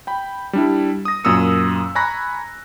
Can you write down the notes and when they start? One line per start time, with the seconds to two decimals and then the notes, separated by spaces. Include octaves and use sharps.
0.07 G5 B5
0.53 G3 D4 E4
1.05 D#6 A#6
1.24 F#2 A#2 D#6 E6 C#7
1.95 G#5 A#5 B5 C#6 F#6 A#6